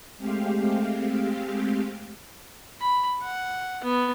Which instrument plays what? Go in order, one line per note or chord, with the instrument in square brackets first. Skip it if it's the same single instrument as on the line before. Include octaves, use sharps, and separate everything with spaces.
[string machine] G#3 A3 C4 G4 F5
[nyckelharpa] B5
F#5
B3